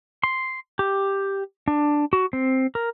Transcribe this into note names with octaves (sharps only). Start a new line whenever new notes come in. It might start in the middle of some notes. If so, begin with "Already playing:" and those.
C6
G4
D4
F#4
C4
A#4